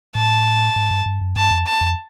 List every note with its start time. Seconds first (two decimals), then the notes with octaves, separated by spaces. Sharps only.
0.15 A2 A5
0.76 G#2
0.91 G2
1.06 G2
1.21 F#2
1.36 G2 A5
1.51 F2
1.66 A5
1.81 F2